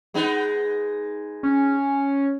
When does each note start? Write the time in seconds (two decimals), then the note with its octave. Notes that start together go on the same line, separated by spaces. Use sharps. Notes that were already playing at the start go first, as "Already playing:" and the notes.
0.14 G#3 B3 D#4
1.43 C#4